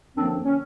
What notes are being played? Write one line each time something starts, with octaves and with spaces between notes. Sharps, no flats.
F#2 D3 F3 A#3 C4 D4
C#4